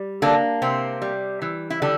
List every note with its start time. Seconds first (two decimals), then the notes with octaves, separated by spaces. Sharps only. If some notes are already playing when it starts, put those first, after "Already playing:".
Already playing: G3
0.22 D3 A#3 D4
0.62 C3 C4
1.02 G3
1.42 E3
1.70 E4
1.82 D3 G3 D4